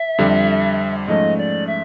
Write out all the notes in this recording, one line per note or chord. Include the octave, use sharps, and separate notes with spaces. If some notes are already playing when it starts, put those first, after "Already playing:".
Already playing: E5
F2 D3 G3
G#2 F3 A3 C#4 D#5
D5
E5